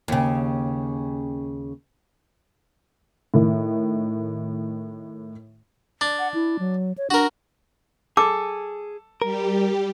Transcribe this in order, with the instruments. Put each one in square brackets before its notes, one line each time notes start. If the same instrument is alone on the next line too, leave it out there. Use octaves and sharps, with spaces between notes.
[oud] D#2 C#3
[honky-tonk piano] A2 D#3
[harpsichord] D4
[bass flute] F#5
E4
F#3
C#5
[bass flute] D4 [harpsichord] F#4 A#4
[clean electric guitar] G#4 [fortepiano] A4 [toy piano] D6
[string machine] G3 G4 [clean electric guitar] A#4